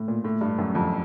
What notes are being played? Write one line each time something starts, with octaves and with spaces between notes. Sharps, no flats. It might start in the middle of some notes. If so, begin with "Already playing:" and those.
Already playing: A2
A#2
A2
G2
F#2
F2